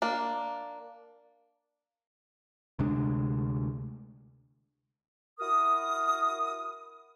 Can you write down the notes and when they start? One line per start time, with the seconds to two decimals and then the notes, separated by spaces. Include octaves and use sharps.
0.02 A#3 D4
2.79 D2 C3 G#3 D4
5.40 E4 F#4 A#4 D#6